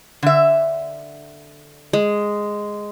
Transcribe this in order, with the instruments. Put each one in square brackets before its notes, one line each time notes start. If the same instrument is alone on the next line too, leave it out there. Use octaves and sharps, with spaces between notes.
[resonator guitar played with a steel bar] D3 E5
[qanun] G#3